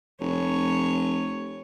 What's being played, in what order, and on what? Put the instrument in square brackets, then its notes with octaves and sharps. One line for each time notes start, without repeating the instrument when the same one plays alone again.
[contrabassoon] F1 [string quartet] C#5